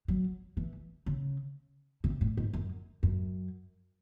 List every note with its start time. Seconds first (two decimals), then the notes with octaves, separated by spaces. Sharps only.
0.08 F#3
0.57 E3
1.06 C#3
2.04 C3
2.21 A2
2.37 G#2
2.53 F#2
3.03 F#2